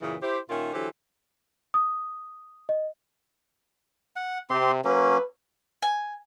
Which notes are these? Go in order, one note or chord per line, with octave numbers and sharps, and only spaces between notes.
F#2 A#2 C#3 E3
E4 G4 C5
A#2 D#3 C#4 F4 A#4 E5
D3 E3 F#3 G4 A4 C5
D#6
D#5
F#5
C3 C4 G4 C6
F#3 A#3 C#4 B4
G#5